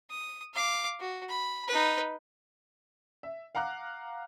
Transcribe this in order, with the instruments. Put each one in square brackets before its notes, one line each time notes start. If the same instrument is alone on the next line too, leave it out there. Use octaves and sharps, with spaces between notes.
[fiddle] D#6
F5 D6
F#4
B5
D#4 B4
[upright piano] E5
F5 F#5 A#5 D6 F#6